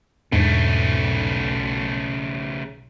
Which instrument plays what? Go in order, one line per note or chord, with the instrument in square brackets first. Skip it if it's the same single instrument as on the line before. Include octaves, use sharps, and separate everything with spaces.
[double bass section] B1 [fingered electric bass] E2 D4 [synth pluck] G#2 [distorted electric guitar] C#3 A3